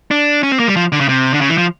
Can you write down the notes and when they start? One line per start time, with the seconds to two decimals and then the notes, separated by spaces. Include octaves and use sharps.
0.11 D4
0.43 C#4
0.52 C4
0.59 A#3
0.68 G3
0.76 F3
0.92 D3
1.01 C#3
1.09 C3
1.34 D3
1.41 C#3
1.49 E3
1.58 F3